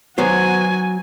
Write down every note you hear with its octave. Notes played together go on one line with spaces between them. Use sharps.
F#3 B3 F#4 C5 G#5